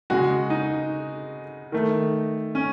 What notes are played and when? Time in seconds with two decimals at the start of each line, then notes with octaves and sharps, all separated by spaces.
0.10 C#3 G#3 F#4
0.50 D#4
1.72 D#3 A3
2.55 C#4